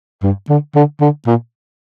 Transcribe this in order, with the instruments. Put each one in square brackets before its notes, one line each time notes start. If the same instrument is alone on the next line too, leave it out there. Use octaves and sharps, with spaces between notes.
[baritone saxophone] G2
D3
D3
D3
A#2